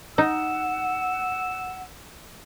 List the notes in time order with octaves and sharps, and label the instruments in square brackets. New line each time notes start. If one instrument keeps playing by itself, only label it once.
[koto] D#4 [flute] F#5 [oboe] E6